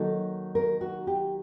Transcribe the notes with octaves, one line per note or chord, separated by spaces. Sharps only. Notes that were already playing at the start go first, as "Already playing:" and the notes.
Already playing: D#3 F#3 A#3 D#4 A4
A#4
F#4
G4